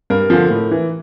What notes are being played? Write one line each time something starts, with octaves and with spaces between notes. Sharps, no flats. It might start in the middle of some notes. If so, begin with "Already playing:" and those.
G2 A#4
D3 F3
A2
E3